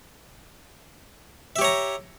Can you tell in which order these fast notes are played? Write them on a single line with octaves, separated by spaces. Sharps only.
E5 G4 C#5 A#5